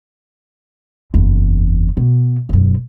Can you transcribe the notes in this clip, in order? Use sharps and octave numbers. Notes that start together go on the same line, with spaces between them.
F#1 E2
B2
E1 F#2